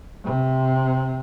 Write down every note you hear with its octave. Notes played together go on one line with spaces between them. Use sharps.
C3